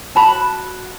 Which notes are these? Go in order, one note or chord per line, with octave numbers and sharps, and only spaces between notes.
F#4 A5 B5